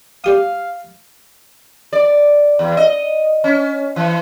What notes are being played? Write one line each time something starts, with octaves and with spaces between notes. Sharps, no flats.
G3 G4 F5 D#6
D5
E2
D#5
C#4
E3